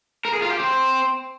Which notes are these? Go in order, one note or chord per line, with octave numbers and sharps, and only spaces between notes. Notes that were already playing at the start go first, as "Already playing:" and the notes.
A#4
G#4
F4
G4
C4